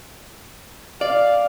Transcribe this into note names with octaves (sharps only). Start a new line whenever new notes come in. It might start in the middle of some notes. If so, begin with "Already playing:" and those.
D5 F5